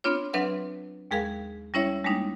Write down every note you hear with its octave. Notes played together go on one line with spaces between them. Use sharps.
B3 C4 D4 F4 C#5
F#3 C4 D4 B4 E5 F#5
D#2 G#3 G#4 A#4 F5
G3 C#4 E4 C#5 E5
G3 G#3 A#3 D4 D#4